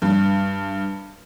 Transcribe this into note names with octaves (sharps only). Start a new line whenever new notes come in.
G2